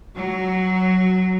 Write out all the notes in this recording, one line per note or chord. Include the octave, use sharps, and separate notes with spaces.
F#3